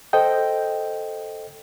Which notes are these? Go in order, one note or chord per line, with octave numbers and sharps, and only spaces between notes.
A4 C5 D#5 G5